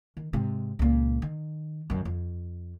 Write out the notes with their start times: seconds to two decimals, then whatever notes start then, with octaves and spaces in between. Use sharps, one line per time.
0.17 D#3
0.33 G#2 C3
0.79 C#2 A#2
1.22 D#3
1.90 F#2 D#3
2.05 F2